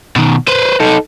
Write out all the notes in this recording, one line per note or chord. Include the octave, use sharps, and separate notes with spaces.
B2 D#3
B4 C5
D#4 A4